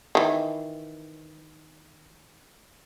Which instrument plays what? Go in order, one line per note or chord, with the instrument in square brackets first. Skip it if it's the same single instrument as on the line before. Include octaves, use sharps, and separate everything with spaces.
[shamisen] D#3 E3